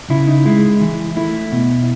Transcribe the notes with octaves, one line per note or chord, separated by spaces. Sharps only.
C#3 E4
D#4
G#3 E4
E3
A3 E4
B2